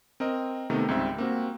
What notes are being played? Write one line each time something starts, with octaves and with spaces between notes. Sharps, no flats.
C4 A#4 D#5
C3 D#3 A3 B3
C#2 G#2 G3 C4 E5
A#3 C4 F#4